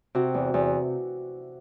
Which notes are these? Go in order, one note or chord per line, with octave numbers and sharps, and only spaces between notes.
C3 F#4
E2
E2